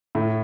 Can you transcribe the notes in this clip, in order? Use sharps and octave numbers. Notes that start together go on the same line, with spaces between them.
A2